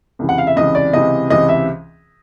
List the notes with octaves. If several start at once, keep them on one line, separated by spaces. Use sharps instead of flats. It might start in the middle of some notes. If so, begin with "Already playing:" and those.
C#2 C3 E3
F#5
F5
E5
C#2 C3 E3 D#5
D5
C#2 C3 E3 D#5
C#2 C3 E3 D#5
E5